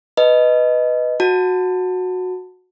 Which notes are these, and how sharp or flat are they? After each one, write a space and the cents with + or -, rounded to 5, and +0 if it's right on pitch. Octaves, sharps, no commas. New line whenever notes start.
B4 +5 D#5 +0 A5 +10
F#4 -15 A5 +20